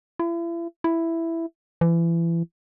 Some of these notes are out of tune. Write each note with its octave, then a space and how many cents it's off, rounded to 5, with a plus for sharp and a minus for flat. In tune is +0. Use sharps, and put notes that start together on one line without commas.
E4 +40
E4 +5
E3 +30